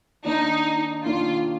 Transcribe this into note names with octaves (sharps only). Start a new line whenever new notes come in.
D#3 A#3 D4 D#4
D#3 A#3 D4 F4